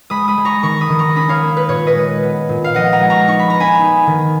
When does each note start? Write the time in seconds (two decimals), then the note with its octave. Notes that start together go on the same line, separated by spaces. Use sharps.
0.10 G#3 B5 D#6
0.28 B5 D#6
0.38 G#3
0.45 A#5 C#6
0.63 D#3 A#5 C#6
0.81 B5 D#6
0.90 D#3
0.99 A#5 C#6
1.16 C#4 B5 D#6
1.29 C#5 F5
1.43 A#3
1.57 B4
1.69 A#2 C#5
1.87 B4 D#5
1.95 G#3
2.23 B3
2.49 A#2
2.64 F5
2.74 F3 D#5 F#5
2.92 F#5 A#5
3.01 G#3
3.10 A#5 C#6
3.28 D#4 C#6
3.39 B5
3.50 B3 A#5
3.60 G#5 B5
3.81 D#4
4.07 D#3